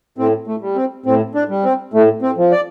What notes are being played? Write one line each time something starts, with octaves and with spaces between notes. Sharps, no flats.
A2 C4
A3
G3
C4
A2 C4
D4
G3
C4
A2 A3
C4
F3
D5